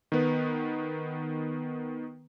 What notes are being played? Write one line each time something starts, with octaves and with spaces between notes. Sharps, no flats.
D#3 B3 B4